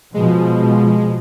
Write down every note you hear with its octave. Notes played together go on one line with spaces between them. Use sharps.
B2 F3 G#3